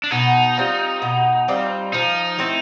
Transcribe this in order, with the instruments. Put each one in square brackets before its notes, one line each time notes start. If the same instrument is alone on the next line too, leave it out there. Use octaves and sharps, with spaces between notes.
[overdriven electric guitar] D4
[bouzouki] B2 [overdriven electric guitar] D#4
[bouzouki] G3 C4 F4
B2
G3 C4 F4
[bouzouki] F3 [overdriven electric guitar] D#4
[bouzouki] A3 C4 E4